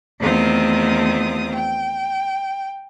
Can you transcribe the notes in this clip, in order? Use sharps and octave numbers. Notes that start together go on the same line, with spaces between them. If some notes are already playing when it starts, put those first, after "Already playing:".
E2 D#3 A3 C4 F4 D#6
G5